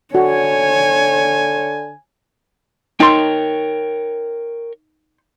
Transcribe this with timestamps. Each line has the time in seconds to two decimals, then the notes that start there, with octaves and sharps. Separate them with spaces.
0.15 D3 F#4 C#5 G#5
3.00 D#4 A#4 C#5 G5 C6